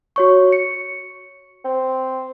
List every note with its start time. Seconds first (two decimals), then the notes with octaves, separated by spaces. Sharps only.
0.16 F#4 C#5 C#6
0.52 C#7
1.65 C4